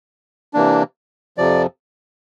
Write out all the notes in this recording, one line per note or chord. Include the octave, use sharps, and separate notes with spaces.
C3 E3 A#3 D4
F2 C3 F3 D5